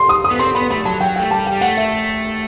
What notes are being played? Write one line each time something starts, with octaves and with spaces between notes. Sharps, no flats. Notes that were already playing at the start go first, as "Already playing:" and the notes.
Already playing: C6
D#6
D#6
B3
C4 C6
B3 B5
A3 B5
F#3 A5
F#3 G5
G5
A3
G3 A5
G5
G3
A3 F#5
E5